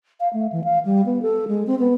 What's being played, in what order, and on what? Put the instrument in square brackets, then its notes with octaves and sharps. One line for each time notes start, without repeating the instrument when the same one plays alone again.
[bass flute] F5
A3
E3
F5
G3
B3
A4
G#3
C4
B3